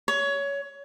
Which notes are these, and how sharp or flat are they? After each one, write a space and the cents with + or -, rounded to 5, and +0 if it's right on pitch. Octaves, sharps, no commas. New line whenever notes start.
C#5 +20